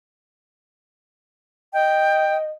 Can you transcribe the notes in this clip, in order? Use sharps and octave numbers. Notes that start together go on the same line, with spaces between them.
D#5 G5